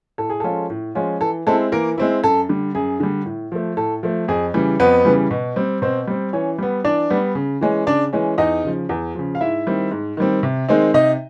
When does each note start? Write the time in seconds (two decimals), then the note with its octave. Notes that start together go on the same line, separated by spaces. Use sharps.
0.18 A2 A4
0.30 G#4
0.40 F3 G#3 C#4 F4 A4
0.70 A2
0.95 F3 G#3 C#4 F4
1.21 E3 A4
1.47 G#3 C4 E4 A4
1.72 E3 A#3 A#4
1.98 G#3 C4 E4
2.23 F#2 A4
2.49 D3 G3
2.75 F#2 G#4
3.00 D3 G3
3.25 A2
3.52 F3 A3
3.77 A2 A4
4.03 F3 A3
4.28 F2 G#4
4.54 C#3 E3 G3
4.80 F2 B3 B4
5.05 C#3 E3 G3
5.31 B2
5.56 G3 C4
5.82 B2 C4 C5
6.08 G3 C4
6.33 E3 C#4 C#5
6.59 G3 B3
6.84 E3 D4 D5
7.10 G3 B3
7.35 C#3
7.61 E3 G#3 C#4
7.87 C#3 D4 D5
8.13 E3 G#3 C#4
8.38 E2 D#4 D#5
8.64 C#3 F3
8.89 E2
9.15 C#3 F3
9.35 F5
9.41 G#2 E4 E5
9.67 D#3 G3 C4
9.91 G#2
10.17 D#3 G3 C4
10.43 C3
10.69 D#3 G#3 C4 D#4
10.94 C3 D#4 D#5